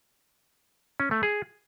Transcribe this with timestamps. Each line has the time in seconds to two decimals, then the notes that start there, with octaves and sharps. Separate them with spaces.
1.00 C#4
1.11 A3
1.23 G#4